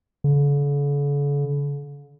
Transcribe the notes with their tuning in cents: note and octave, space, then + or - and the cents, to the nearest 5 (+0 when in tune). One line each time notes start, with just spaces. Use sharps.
D3 -45